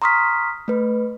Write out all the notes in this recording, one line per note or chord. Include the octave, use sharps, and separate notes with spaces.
A#5 C6 C#6 D#6 F6 B6
A3 B4